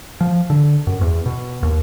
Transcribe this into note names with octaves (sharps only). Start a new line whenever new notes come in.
F3
D3
F#2
E2
B2
D#2